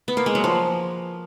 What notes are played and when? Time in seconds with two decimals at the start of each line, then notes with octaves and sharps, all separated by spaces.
0.08 B3
0.17 A#3
0.26 G#3
0.35 F#3
0.44 F3